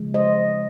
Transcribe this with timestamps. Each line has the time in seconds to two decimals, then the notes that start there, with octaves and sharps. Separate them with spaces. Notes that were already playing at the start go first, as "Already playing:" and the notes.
Already playing: C#3 F3 G#3
0.14 C5 D#5